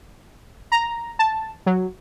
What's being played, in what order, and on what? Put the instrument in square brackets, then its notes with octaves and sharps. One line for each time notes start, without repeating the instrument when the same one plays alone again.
[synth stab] A#5
A5
F#3